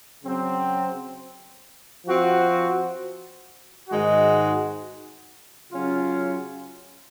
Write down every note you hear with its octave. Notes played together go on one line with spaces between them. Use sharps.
C#3 F#3 C4
F3 C4 F#4
G#2 D#3 G#3 D#4 F#4
C#3 F#3 C#4 F4